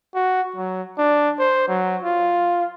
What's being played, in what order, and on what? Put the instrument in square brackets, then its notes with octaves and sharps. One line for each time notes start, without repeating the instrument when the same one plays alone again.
[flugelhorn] F#4
F#3
D4
C5
F#3
F4